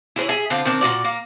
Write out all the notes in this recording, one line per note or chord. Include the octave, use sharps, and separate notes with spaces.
E4 G#4 C5 C#5
G#4 E5 G#5
D3 C4 F4
D#3 C4 D4
A#2 F#3 F#4 D5
A#3